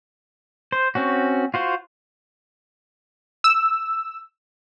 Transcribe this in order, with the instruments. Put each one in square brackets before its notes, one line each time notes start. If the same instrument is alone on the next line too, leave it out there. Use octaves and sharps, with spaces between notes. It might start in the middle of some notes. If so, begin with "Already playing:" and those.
[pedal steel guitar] C5
C4 C#4 F#4
F4 F#4 C5
[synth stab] E6